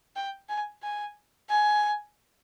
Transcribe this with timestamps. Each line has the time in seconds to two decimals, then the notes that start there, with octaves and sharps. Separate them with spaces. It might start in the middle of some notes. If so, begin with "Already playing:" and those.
0.16 G5
0.49 G#5
0.82 G#5
1.50 G#5